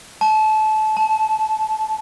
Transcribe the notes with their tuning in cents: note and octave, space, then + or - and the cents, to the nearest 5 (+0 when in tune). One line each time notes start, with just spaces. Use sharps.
A5 -25
A5 -5